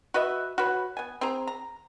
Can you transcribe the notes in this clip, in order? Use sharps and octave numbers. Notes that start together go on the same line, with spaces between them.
F#4 B4 D#5 E5
F#4 B4 C#5
B3 G#5
C4 G#4 A#5
A#5